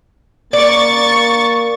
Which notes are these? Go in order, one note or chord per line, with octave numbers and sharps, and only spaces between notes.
A#3 D5 C#6 A6